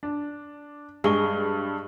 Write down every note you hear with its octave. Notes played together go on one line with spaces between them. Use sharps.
D4
G2 G#3 C#6 G7